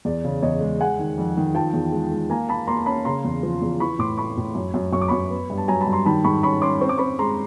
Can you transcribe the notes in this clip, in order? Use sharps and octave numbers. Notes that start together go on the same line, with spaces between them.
E2 D5
C#3
E2 C#5 D#5
G#3
G#3 F#5 G#5
D#3
F2
D#3
F3 G5 A5
E2
G#3
G#3
A#3 G#5 A#5
A#3 A5 B5
A#3 A#5 C6
C#4 A5 B5
C#3 A#5 C6
E2
F3
E2
E3 B5 C#6
A2 C6 D6
A3 B5 C#6
A2
F#2
F#2
F#2 C#6
D6
F#2 B5 C#6
B3
G2
A5
F#3 G#5 A#5
A5 B5
G2
A#5 C6
D#3 A5 B5
G#2 B5 C#6
C#4 B5 C#6
C#4 C6 D6
C4 C#6
D6
C4 B5 C#6
G#3 A#5 C6